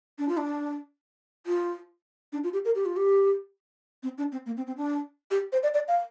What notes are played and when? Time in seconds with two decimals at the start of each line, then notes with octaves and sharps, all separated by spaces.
0.18 D4
0.28 F4
0.37 D4
1.46 F4
2.32 D4
2.44 F4
2.53 G4
2.65 A#4
2.75 G4
2.85 F4
2.96 G4
4.03 C4
4.18 D4
4.32 C4
4.46 A#3
4.57 C4
4.67 C4
4.77 D4
5.31 G4
5.52 C5
5.63 D5
5.74 D5
5.88 F5